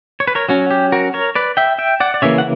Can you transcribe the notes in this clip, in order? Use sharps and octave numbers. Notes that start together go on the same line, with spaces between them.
C#5
B4
A#4 C#5
F#3 C#4 F#4
G4
F#4 A#4
A#4 C#5
B4 D5
E5 G5
E5 G5
D5 F#5
D5
C#3 E3 A#3 C#5 E5
F#5